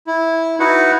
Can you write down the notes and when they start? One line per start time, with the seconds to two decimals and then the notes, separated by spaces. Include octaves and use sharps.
0.07 E4
0.60 D#4 E4 F#4 B4 F#5